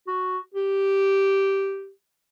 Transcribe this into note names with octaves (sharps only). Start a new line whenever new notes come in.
F#4
G4